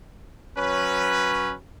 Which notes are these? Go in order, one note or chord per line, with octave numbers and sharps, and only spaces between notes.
F#3 C#4 B4